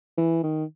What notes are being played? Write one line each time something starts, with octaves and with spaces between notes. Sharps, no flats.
E3
D#3